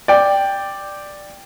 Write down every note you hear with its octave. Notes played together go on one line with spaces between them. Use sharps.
D5 G5